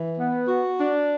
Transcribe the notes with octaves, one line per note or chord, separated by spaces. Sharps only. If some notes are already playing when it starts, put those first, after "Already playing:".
Already playing: E3
B3
F#4
D4